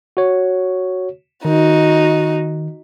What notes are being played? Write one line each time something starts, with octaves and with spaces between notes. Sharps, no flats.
F#4 C#5
D#3 D#4 F#4